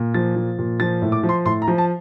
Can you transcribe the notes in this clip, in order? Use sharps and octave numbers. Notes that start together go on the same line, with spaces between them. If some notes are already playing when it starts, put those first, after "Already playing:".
Already playing: A#2
F3 A6
F3
A#2
F3 A6
A2
D6
F3
C6
A2 C6
A#5
F3
A5